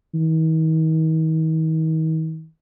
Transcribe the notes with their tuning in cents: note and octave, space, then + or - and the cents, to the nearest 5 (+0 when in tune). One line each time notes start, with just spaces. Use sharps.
D#3 +40